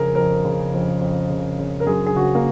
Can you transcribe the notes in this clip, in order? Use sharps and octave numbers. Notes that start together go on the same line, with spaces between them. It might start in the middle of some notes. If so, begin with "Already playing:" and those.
Already playing: F2 C#3 G#4 A#4
F2 A#4
C#3
F2
F2
C#3
C#3
A#4
F#2 G#4
G#4
C#3 F#4
A#3